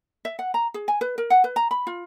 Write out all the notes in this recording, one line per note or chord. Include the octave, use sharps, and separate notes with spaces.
E5
F#5
A#5
G#4
G#5
B4
A#4
F#5
B4
A#5
B5
F4